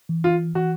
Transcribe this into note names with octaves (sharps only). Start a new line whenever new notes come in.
E3
F4
E3 F#4